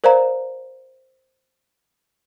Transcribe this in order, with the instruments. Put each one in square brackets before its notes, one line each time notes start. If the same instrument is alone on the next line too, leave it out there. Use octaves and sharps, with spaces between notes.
[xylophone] A#4 C5 D5 F5 A#5